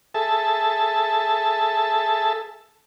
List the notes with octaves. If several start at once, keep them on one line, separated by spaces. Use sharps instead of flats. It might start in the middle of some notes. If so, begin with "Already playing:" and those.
G#4 A4 E5 A5